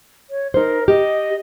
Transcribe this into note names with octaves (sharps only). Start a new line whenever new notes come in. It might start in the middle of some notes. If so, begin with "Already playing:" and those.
C#5
D#4 A#4 C5
G4 D#5